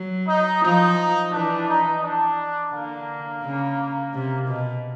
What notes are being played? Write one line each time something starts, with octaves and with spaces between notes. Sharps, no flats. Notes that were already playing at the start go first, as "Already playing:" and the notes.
Already playing: F#3
D#4
F3 D#4
E3 D4
D#4
D4
D3 A#3
C#3
C3
B2